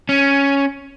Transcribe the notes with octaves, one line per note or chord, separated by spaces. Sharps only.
C#4